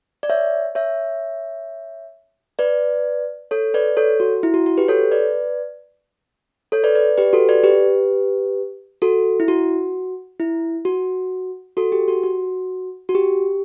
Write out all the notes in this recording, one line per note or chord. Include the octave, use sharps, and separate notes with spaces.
D5
C#5 E5
C#5 E5
B4 D5
A4 C#5
B4 D5
A4 C#5
F#4
E4
F#4
F#4
G4 B4
A4 C#5
B4 D5
A4 C#5
B4 D5
B4 D5
G4 B4
F#4 A4
B4 D5
G4 B4
F#4 A4
E4
F#4
E4
F#4
F#4 A4
G4
F#4
F#4
F#4
G4